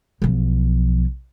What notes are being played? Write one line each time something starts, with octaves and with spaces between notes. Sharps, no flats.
B1 F3